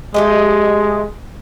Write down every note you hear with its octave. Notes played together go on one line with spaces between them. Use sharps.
G#3 A3 G4 D#5